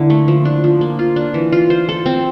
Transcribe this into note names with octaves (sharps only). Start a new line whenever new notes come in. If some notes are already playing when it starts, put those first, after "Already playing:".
Already playing: D3 A#3 E4
A3
F3
D4
F3
A#3
F4
D4
E3
F4
C5
A4
C4